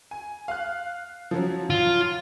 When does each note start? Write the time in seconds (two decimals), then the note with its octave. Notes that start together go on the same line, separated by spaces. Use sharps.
0.11 G#5
0.48 F5 F#6
1.31 F3 F#3 C#4
1.70 F4